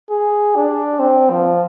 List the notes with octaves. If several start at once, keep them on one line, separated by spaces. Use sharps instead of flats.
G#4
D4
C4
F3